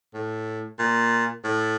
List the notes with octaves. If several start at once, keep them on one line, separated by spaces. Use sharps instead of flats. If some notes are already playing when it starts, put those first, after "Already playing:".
A2
A#2
A2